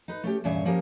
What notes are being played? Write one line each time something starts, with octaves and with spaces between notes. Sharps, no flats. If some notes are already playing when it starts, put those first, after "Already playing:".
D#4 B4
A3 C#4 G4
E2 G2 A#2 C#4 E5
F3 A#3 C#4 G4 A#4